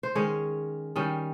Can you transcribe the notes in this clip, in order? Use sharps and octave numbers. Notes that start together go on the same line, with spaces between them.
C5
D#3 G#3 C#4 C#5
D#3 G3 C#4